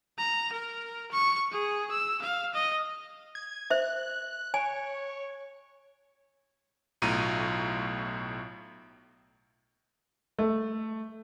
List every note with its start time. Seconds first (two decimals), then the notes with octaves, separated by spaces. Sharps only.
0.18 A#5
0.52 A#4
1.11 C#6
1.52 G#4
1.91 E6
2.22 F5
2.54 D#5
3.35 G#6
3.70 C5 E5 F#6
4.54 C#5 G#5
7.02 B1 A2 F4 A#5 D#7
10.39 A3